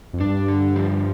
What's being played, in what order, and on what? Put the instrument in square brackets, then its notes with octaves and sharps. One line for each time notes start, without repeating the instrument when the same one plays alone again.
[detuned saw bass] F2
[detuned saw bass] G2 [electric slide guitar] D4
[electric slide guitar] D3
F3